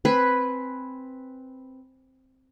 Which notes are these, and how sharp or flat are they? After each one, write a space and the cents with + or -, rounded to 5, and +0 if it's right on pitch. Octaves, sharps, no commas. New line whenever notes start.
C4 +0 B4 +0 G#5 +0